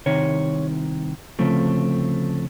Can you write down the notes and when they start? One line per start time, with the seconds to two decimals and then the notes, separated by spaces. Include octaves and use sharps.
0.06 C2 C3 D#3 C#5
1.39 D2 C#3 F3 A3 C4